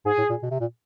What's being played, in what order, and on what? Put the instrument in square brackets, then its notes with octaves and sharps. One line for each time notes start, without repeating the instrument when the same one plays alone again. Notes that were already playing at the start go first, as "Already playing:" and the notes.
[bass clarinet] G#2 [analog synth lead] G#4
[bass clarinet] A2
A#2
B2
C3
A#2